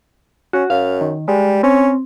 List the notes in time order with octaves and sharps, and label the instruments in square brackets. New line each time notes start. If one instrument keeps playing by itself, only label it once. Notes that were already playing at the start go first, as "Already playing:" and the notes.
[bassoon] C#4 [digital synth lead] F#4
[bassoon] F#2 [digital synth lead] F5
[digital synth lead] D#3
[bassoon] G3 [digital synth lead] G#3
[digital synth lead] C4 [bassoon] C#4